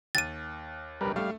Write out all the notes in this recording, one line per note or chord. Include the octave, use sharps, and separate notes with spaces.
D#2 A6 D#7
D1 A#1 G3 A#4 B4
G3 A3 F5